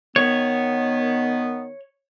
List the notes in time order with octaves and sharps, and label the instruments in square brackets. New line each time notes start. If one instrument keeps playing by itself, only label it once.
[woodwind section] D#3 B3 [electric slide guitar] C#5